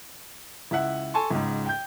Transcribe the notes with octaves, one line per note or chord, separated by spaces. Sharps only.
C#2 E4 E5 F#5
A4 G#5 A5 C6 C#6
C#2 G#2
G5 G6